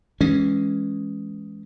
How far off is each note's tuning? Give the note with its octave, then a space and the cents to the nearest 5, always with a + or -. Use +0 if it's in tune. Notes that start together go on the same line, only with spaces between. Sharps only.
E3 +0 G#3 +0 C#4 +0